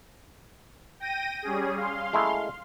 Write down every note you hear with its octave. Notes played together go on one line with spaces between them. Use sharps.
G5 A#6 D#7
G3 C#4 G#4
F5 C6
G#3 A3 E4